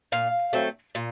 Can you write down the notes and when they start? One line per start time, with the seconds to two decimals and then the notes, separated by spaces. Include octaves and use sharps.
0.12 A#2 F5
0.53 F#3 A3 C4
0.95 A#2